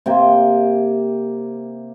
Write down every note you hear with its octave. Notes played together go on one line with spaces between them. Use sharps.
C3 A#3 G5